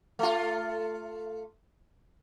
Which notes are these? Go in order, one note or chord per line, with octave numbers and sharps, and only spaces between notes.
A3 F4